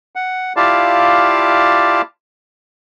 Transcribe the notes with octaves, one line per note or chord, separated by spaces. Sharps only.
F#5
E4 F4 G4 D5 F5 A5